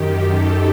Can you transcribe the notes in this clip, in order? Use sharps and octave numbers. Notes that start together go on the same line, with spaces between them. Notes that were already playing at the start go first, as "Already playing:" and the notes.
Already playing: F#2 D#3 G4
A4